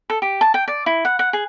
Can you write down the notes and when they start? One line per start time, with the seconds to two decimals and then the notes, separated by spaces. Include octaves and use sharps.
0.10 A4
0.22 G4
0.41 A5
0.54 G5
0.68 D5
0.86 E4
1.05 F#5
1.19 F#5
1.33 G#4